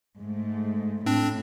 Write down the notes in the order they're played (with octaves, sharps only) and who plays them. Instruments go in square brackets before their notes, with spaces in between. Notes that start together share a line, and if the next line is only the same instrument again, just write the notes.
[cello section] G#2 A3
[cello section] A2 [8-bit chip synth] C4 D4